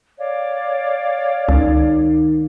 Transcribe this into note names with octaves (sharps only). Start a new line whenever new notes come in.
C#5 D5 F5
C#2 D#3